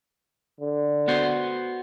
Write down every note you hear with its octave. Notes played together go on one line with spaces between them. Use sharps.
D3
B3 F#4 C5